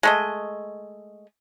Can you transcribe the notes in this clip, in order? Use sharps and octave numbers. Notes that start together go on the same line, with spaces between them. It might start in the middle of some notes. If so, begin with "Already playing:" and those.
G#3 A3 D#5